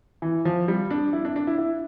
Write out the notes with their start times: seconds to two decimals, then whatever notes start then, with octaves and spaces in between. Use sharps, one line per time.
0.22 E3
0.45 F3
0.68 G3
0.91 D4
1.13 E4
1.25 D4
1.36 D4
1.47 E4
1.58 E4